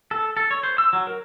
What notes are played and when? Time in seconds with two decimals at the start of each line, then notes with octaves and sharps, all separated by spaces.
0.11 A4
0.37 A4
0.51 C#5
0.63 C5
0.78 E6
0.93 F#3
1.07 A#4